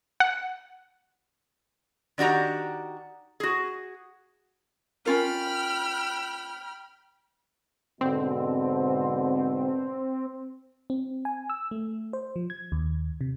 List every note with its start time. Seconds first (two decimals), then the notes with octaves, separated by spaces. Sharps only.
0.20 F#5
2.18 D#3 D4 F#4 G4 A#5
3.40 F#4 G#4
5.06 C#4 F4 A#4 G5 B5 F6
8.01 G#2 B2 D3 C4
10.90 C4
11.25 G#5
11.50 E6
11.71 A3
12.13 C5
12.36 F3
12.50 G#6
12.72 D#2
13.21 C3